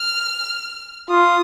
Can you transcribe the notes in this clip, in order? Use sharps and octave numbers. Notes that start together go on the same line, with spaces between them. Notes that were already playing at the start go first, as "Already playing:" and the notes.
Already playing: F6
F4 D#6